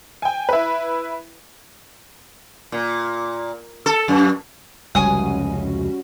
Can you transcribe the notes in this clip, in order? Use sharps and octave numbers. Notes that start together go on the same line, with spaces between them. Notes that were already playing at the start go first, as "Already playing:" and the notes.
G5 G#5
E4 B4
A#2
A4
F#2
F1 C#2 G3 C#4 F#4 G#5 D#6